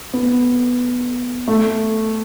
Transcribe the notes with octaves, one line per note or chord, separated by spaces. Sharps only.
B3
A3